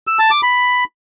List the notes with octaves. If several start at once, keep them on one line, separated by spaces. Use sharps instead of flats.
E6
A5
D6
B5